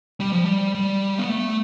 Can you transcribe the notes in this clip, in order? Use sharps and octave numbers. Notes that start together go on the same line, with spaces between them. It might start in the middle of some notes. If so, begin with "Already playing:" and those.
G3
F3
G3
G3
B3
A3